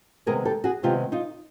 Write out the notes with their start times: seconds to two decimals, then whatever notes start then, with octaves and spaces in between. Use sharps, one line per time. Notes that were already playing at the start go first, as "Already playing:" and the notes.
0.26 C3 D#3 G#3 B3 G#4 A#4
0.45 G4 A4
0.64 F#4 G#4
0.83 C3 D#3 G#3 B3 F4 G4
1.12 D#4 F4